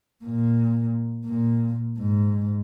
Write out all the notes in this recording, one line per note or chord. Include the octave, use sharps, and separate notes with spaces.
A#2
A#2
G#2